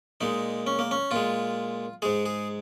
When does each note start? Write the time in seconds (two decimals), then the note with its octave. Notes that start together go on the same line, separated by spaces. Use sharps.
0.21 A#2 G#3 D#4
0.67 C#4
0.79 A#3
0.91 C#4
1.11 A#2 G#3 F4
2.02 G#2 G#3 G#4
2.26 G#4